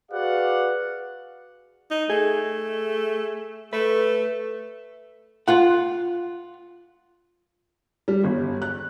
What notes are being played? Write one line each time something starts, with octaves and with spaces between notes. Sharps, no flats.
F#4 G#4 B4 D5 F5 F#5
D#4
A3 G#4
A3 B4
F4 F#5
G3
G1
F#6